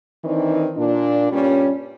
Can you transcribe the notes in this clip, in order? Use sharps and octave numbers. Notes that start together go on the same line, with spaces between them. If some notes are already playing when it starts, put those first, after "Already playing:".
D#3 E3 C4 D4 D#4
A#2 D4
G2 A#2 G3 C#4